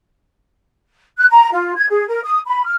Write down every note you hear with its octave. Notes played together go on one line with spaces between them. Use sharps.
F#6
A#5
F4
G#6
G#4
A#4
D#6
B5
F6